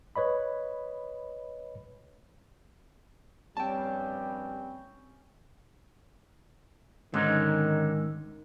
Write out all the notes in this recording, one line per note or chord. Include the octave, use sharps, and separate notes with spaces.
B4 C#5 D#5 B5
A#1 G2 G3 C4 C#4 G5 A5
G#2 D3 D#3 C#4 D#4